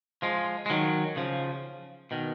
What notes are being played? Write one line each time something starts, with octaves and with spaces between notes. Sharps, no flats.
F3 G#3
G#3
D#3 F#3
C#3 F3
B2 D#3